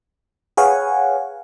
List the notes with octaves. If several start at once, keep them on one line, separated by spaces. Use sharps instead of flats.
G#4 B4 C#5 F5 F#5 G#5